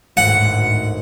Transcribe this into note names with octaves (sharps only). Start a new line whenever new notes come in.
G#1 D2 A2 F#5